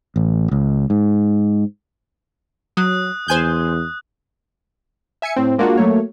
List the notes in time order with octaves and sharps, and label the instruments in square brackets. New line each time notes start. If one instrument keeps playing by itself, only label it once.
[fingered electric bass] A1
C#2
G#2
[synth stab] F#3 [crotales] D#6 F#6
[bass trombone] E2 [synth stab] C5 G#5 G6
[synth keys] E5 G#5 G#6 C#7
A2 C4
G#3 A#3 D4 F4 F#4
F#3 A3 A#3 C#5